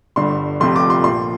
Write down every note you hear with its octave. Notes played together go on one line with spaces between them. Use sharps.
G1 G2 D3 G3 C6
F1 F2 C3 F3 C6
D6
C6
A#1 A#2 F3 C6